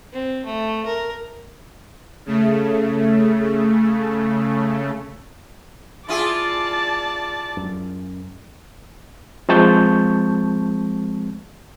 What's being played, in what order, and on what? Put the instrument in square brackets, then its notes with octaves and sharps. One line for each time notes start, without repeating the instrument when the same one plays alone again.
[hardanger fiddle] C4
A3
A#4
[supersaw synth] C#3 A3
[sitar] E4 F4 G#4 [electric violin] D5 A5
[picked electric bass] F#2
[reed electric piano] F3 G#3 C4 A5 C#6 G6